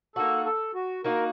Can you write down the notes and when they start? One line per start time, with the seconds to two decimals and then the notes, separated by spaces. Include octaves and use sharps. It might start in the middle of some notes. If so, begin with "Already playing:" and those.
0.16 A#3 D#4 F#4 A4
0.45 A4
0.75 F#4
1.04 A#3 D#4 F#4 A#4